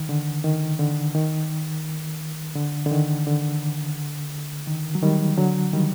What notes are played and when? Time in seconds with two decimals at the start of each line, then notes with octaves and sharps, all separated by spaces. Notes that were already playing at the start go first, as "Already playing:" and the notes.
Already playing: D#3
0.09 D3
0.44 D#3
0.79 D3
1.15 D#3
2.56 D3
2.86 D3
2.91 D#3
3.27 D3
4.67 D#3
4.95 F#3
5.03 D#3 G3
5.38 D3 F#3
5.73 D#3 G3